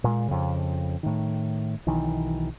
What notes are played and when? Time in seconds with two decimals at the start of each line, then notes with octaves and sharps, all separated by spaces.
0.04 A#2 G#3
0.28 F2 C#3
1.03 A2 D#3
1.86 B1 D#3 E3